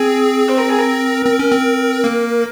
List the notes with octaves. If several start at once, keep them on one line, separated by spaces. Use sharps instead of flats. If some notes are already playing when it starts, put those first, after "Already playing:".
Already playing: C4 G#4
C5
A#4
G#4
A#4
C4
C#4
C4
A#3